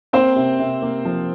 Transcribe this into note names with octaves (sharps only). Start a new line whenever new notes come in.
A#3 C4 C5
C3
C3
A#3
F3